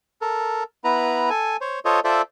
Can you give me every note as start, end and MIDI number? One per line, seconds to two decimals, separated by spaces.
0.21 0.63 69
0.21 0.63 70
0.84 1.29 59
0.84 1.29 64
0.84 1.29 71
0.84 1.29 82
1.30 1.57 69
1.30 1.57 80
1.61 1.79 72
1.61 1.79 73
1.85 2.00 65
1.85 2.00 69
1.85 2.00 72
1.85 2.00 73
1.85 2.00 75
2.04 2.22 65
2.04 2.22 69
2.04 2.22 72
2.04 2.22 74
2.04 2.22 76